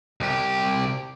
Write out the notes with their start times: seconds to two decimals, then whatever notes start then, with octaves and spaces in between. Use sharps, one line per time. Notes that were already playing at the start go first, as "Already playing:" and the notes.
0.20 C2 G4